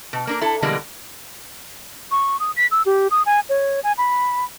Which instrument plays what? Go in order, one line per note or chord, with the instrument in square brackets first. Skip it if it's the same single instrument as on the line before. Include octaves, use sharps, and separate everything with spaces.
[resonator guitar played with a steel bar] B2
A#3 D4 A#4
E4 A4
B2 D3 E3 G3 G#3 A#3
[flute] C#6
D#6
B6
E6
G4
D#6
G#5
C#5
G#5
B5